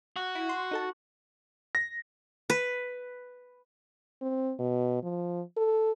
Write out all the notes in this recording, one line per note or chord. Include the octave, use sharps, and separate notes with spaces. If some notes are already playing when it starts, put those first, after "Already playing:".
F#4
E4
C6
D#4 A4 A5
A#6
B4
C4
B2
F3
A4